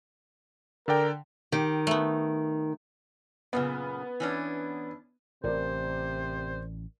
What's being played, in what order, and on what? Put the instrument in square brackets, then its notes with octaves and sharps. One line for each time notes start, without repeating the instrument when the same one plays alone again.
[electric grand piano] D3 D5 G5 [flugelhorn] A#4
[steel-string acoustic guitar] D#3 [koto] G4
[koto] A3 B3
[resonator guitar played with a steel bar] F#2 A#2 C#3 [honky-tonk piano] B3
[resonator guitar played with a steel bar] E3 C#4 D4
[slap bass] A1 [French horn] C3 [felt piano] A#4 D5 [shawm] C5